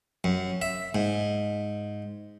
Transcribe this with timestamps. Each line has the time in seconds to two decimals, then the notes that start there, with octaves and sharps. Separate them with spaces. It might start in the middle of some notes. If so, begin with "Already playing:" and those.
0.24 F#2
0.62 E5
0.95 G#2